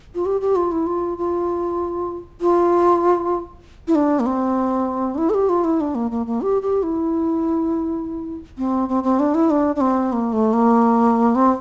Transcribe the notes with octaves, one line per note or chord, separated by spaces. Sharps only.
F4
G4
G4
F4
E4
F4
F4
F4
E4
D4
A#3
C4
D4
E4
A4
G4
F4
E4
D4
A#3
A#3
A#3
G4
G4
E4
C4
C4
C4
D4
E4
D4
D4
C4
A#3
A3
A#3
C4